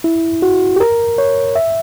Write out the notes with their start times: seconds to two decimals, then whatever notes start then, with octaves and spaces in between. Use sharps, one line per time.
0.04 E4
0.42 F#4
0.76 G4
0.80 A#4
1.18 C#5
1.56 E5